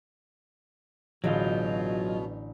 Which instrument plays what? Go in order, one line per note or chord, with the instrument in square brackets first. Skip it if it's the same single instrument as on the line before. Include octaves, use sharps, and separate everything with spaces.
[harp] A1 D3 G6 [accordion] B2 [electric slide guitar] F#3 F4 [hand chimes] G#4 D#5